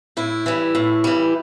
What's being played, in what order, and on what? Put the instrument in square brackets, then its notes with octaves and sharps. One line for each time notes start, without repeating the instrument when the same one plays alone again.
[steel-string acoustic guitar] A2 E4
E3 G3
A2
E3 G3